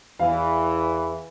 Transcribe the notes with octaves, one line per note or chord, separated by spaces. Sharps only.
E2 E3 F5